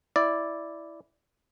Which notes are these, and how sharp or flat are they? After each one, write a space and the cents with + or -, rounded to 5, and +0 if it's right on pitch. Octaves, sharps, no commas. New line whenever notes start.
E4 +0 D5 +0